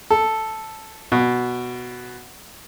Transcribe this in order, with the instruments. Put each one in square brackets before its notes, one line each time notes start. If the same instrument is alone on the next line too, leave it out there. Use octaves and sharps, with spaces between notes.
[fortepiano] A4
B2